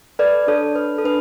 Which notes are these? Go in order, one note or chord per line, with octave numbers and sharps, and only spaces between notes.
A4 B4 D5
D4 A4 C#5
A4 B4
A4
D4 B4